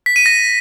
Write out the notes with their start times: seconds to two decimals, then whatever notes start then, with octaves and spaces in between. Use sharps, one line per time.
0.06 B6
0.16 D#7
0.26 A#6